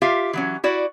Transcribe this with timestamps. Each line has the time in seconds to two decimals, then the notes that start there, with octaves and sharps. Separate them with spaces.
0.02 F4 G4 E5 F5
0.33 E3 F#3 C#4
0.64 E4 F#4 D5